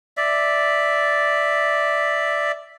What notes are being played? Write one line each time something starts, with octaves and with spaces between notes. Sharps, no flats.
D5 E5